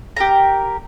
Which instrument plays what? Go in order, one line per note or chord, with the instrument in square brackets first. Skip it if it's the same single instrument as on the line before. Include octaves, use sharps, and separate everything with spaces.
[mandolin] G4 A#4 A#5